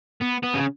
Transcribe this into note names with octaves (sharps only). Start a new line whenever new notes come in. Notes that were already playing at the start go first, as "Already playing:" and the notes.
B3
B3
C#3